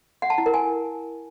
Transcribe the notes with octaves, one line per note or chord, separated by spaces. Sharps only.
F#5
A5
E4
A#4
G#5